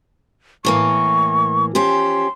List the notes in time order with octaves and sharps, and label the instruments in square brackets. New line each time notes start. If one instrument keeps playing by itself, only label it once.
[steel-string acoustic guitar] A2 E3 A#3 [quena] C#6
[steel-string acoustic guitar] F3 C#4 G4 [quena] C6